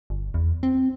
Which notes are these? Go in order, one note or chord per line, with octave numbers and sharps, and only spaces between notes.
G1
E2
C4